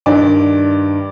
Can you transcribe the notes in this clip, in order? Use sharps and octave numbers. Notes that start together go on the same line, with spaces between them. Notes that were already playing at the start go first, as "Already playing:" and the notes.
G2 D#3 D5